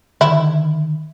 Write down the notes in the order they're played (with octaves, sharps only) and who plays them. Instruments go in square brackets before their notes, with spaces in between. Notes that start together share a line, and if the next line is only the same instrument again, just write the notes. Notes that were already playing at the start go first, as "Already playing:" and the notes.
[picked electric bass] D3 D#3 [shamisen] E4